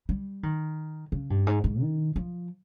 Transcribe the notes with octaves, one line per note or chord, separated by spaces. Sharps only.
G3
D#3
C#3
G2
G#2
G#2
D#3
F3